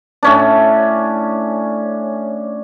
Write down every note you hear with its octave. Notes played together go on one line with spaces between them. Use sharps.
A2 C#4 D4